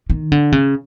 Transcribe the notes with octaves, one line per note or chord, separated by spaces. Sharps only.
D#3
D3
C#3